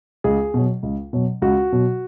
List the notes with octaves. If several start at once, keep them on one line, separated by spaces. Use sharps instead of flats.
C#2 G#4
B2 F#3
C#2
B2 F#3
C#2 F#4
B2 F#3